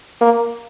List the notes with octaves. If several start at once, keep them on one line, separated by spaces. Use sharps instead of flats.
A#3